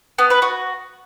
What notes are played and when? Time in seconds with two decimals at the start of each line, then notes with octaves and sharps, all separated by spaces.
0.19 B3
0.30 B4
0.42 F#4